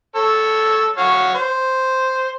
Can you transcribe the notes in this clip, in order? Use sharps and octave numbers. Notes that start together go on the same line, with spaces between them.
A4 C#5
F#4 C#5 F5
C5